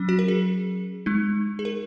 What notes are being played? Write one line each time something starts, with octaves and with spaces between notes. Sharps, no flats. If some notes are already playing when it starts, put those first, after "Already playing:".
Already playing: F#3 C#4
F#4
A#4
G#4
G#3 D#4
G#4
A#4